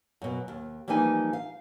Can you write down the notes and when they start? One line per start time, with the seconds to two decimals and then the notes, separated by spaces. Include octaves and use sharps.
0.22 F#2 B2
0.48 D#2
0.88 E3 F3 G3 A#3 D#4 G#5
1.33 F5